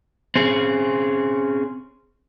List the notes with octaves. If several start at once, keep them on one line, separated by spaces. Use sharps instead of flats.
C4 C#4 G#4